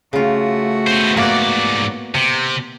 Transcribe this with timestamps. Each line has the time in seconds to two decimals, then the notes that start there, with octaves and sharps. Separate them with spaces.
0.13 C#3 A3 F4 F#4
0.87 B3 C5
1.17 G#2 A#3 B3 D5
2.15 C3